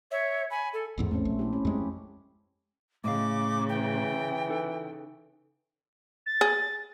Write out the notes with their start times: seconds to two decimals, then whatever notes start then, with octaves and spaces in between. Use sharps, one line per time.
0.11 C#5 E5
0.51 G#5 B5
0.73 A4
0.98 A1 E2 G#2
1.11 A3 C4 C#4
1.25 A#1
1.39 E4 G4
1.53 C#4
1.65 F2 G#3 G4
3.04 A2 C#3 D#5 F5 D6
3.69 E3 G5
4.49 D#4 A4 B4
6.26 A6
6.41 G#4